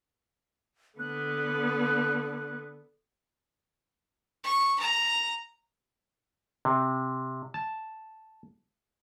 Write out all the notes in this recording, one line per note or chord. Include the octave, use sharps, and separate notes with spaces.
D3 B3 F#6
C#6
A#5
C3
A5